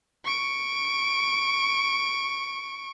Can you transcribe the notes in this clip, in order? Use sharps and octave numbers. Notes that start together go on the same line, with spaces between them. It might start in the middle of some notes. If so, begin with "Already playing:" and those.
C#6 D7